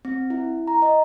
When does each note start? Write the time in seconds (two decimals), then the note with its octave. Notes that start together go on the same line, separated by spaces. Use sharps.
0.05 C4
0.30 E4
0.67 A#5
0.82 D#5